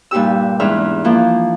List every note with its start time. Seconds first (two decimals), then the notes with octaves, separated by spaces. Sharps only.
0.11 G2 A#2 D#4 G4 E6
0.60 E2 G#2 D4 E5 F6
1.04 E3 F3 A#3